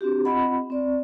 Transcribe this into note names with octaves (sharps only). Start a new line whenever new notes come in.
C4 D4 F#4 G4
C4 F4 D#5 F#5 B5
C4 D5